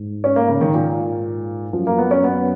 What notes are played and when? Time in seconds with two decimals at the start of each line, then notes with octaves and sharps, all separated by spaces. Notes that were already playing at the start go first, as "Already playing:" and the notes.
Already playing: G#2
0.24 C#4
0.36 A#3
0.48 C#3
0.61 D#3
0.74 A#2
1.73 F#2 F3
1.87 A#3
1.98 B3
2.11 C#4
2.24 B3